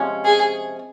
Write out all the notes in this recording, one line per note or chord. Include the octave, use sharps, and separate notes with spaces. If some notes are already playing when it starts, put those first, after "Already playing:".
Already playing: C3 F3 G#3 C#4
G#4